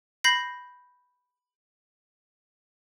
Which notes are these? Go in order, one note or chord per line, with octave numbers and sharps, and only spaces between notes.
B5 G6 A#6 C7